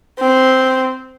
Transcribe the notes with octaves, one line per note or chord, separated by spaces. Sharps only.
C4